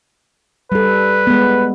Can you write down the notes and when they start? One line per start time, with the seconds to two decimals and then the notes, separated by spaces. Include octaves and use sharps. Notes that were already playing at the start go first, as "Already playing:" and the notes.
0.72 G3 A4 B4
1.27 G#3 B3